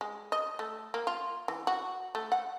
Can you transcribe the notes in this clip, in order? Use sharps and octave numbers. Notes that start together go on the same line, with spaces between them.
G#3
D#5
A3
A#3
F4
E3
F#4
A3
F#5